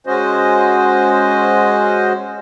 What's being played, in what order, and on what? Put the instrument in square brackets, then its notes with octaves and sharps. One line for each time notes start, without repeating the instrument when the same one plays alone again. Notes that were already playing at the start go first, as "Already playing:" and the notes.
[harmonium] G#3 C#4 F#4 C5 D#5